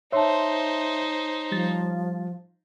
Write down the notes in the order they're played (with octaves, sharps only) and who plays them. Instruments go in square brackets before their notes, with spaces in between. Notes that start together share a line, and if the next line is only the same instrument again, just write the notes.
[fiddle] D#4 C5 [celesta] C#5 A5 [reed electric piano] E5 C6
[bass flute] F3 [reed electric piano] G3 A6